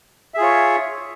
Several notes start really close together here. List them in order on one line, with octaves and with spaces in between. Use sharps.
E5 G#4 F4 C#5